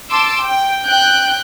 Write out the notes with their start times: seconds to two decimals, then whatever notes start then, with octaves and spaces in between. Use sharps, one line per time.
0.10 A5 C6 D6 E6
0.44 G5
0.87 G5 F#6 G6